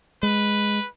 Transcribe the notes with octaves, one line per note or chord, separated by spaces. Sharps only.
G#3 B4